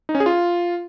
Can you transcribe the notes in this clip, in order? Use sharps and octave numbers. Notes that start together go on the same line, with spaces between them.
D#4
C#4
G#4
F4